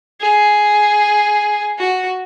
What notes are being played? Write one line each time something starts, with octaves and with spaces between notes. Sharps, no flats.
G#4
F#4